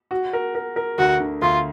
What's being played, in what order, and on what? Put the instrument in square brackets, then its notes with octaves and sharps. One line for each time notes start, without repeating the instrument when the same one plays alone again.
[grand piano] F#4
A#4
A#4
A#4
[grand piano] D2 [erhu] F#4
[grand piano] D3
[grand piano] D2 [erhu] F4